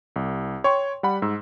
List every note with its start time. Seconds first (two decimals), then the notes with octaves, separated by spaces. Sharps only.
0.16 C2
0.64 C#5 G5 C6 C#6
1.03 G3 F#5 B5
1.22 G#2 E6